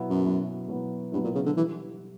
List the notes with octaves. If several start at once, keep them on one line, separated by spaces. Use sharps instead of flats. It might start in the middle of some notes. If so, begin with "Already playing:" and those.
Already playing: B2 F#3 B3 E4
F#2
B2 F#3 B3 E4
B2 F#3 B3 E4
G2 B2 F#3 B3 E4
A#2
C#3
D3
E3 G3